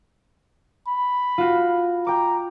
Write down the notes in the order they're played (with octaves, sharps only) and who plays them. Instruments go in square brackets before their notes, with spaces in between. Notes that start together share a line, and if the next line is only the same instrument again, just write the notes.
[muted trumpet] B5
[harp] F4 F#4
[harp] G5 D6 [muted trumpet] A#5